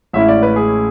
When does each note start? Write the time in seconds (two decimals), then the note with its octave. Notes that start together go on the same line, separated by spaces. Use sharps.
0.13 A1 A2 G#3 C#4 E4 E5
0.28 D5
0.43 B4
0.56 G#4